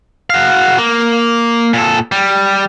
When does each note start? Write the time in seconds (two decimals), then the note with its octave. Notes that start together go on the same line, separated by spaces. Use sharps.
0.30 F#4 F5
0.78 A#3
1.74 A#2 A4
2.12 G3